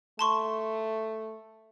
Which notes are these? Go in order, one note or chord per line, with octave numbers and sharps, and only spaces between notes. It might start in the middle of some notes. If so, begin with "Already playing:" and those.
A3 A5 C6 C#6